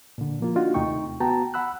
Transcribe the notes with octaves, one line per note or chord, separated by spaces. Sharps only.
A#2 D3
F3 A#3 F4
D4 D#4 F4 F#4
D#2 C3 A3 D#4 G5 C#6
B3 F#4 G5 A5 A#5
F#5 B5 E6 F#6